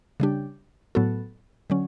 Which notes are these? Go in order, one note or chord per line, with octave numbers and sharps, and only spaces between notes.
C#3 G3 D4 G4
A2 F#3 B3 F#4 A4
D3 F#3 C#4